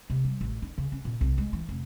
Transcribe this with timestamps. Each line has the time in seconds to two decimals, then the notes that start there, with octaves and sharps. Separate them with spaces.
0.10 C3
0.24 G3
0.41 A1
0.62 D#4
0.78 C#3
0.92 C#4
1.05 A#2
1.21 C2
1.38 G#3
1.53 E3
1.69 F1